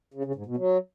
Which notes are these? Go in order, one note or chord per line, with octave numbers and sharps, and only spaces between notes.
C#3
C#3
G#2
B2
F#3